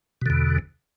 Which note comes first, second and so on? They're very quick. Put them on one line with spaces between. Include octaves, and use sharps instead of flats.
B2 D3 E2